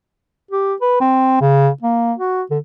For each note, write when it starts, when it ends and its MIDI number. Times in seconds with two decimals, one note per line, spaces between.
0.51 0.75 67
0.81 0.99 71
1.01 1.38 60
1.41 1.69 49
1.82 2.13 58
2.18 2.42 66
2.51 2.58 50